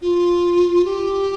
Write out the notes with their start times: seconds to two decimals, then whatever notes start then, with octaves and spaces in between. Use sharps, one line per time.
0.02 F4
0.85 G4